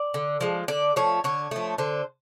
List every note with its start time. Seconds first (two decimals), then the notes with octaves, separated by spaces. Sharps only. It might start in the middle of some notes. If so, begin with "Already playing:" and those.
Already playing: D5
0.14 D3
0.41 F3 G#3
0.68 D3 D5
0.96 F3 A3 C#5
1.24 D3 C#5
1.51 F3 A3
1.78 D3 C5